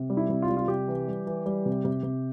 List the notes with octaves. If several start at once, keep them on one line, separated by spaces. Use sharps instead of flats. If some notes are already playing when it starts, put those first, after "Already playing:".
Already playing: C3
G3
E4
C3
F4
G3
F4
C3 G4
E3
G3
E3
G3
C3
C3
C3